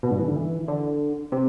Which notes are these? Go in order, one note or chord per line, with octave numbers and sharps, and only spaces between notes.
B2
G2
E3
D3
E3
D3
C3